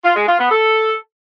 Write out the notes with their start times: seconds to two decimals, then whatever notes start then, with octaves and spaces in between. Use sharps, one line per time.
0.04 F4
0.16 G#3
0.28 F4
0.39 B3
0.51 A4